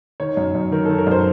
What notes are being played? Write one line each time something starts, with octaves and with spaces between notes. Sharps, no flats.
D#3 C#5
F#2
F#2
D#3 A#4
A4
D#3
A#4
F#2 C5